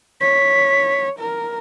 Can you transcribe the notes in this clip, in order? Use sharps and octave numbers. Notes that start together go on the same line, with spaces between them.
C#5 B6
A#4